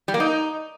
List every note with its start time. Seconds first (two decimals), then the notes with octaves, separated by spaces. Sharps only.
0.08 G3
0.14 A#3
0.20 D#4